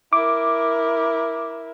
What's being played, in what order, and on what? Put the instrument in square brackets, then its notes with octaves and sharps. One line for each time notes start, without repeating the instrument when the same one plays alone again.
[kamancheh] E4 A#4 [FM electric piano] D6